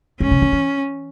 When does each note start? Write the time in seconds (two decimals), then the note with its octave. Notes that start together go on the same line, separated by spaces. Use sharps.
0.20 G#2 C#4
0.31 C3
0.42 D#3
0.52 E3